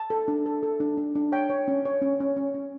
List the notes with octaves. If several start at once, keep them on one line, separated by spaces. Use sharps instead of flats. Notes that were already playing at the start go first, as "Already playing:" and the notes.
Already playing: A5
A4
D4
A4
A4
D4
D4
D4
C#5 G5
C#5
C#4
C#5
C#4
C#4
C#4
C#4